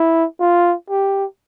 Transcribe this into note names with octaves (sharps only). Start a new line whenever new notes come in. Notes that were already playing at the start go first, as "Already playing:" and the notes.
Already playing: E4
F4
G4